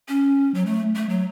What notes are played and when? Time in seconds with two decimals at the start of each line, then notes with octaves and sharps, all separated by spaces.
0.08 C#4
0.54 F#3
0.66 A3
0.96 A3
1.09 F#3